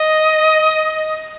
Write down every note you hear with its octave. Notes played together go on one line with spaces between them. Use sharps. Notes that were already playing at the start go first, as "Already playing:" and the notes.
Already playing: D#5